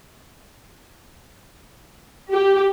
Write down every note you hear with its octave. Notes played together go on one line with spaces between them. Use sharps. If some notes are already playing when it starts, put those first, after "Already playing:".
G4